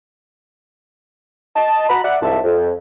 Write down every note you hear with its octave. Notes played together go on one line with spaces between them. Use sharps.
D#5 A5
F#4 A#5 B5
D5 E5 F#5
C2 G#2 F3 E5 A5
F2